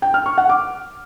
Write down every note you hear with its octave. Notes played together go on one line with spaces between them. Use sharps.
G5
F6
C#6
F#5
D6